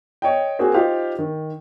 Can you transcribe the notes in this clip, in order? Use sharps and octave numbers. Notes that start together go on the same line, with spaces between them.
C#5 D#5 G5
A#3 C4 F#4 G#4
D#4 F4 G4 C5 F5
D#3